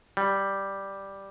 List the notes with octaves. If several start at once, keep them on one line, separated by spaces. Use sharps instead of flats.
G3